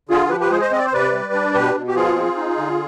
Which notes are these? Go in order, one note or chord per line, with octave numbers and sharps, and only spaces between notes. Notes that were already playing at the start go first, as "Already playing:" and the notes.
D3 F4 G#4
G#4
F3 G4 B4
G4 B4
G#3 G#4 C5
C5 D#5
C4 D#5
D5
C5
C3 B4 D5
G3
D4
B2 G4 B4
B2
G4
F3 F4 G#4
C4
D#4
D3